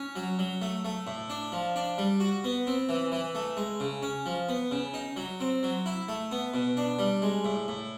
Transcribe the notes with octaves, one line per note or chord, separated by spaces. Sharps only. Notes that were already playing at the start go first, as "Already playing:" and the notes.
Already playing: C#4
F#3
F#3
A3
A3
A2
D4
F3
D4
G3
F#4
B3
C4
E3
E3
A3
G#3
C#3
C#4
F3
B3
C#3
D#4
F#3
C4
F#3
E4
A3
B3
B2
D4
G3
G#3
A2
A2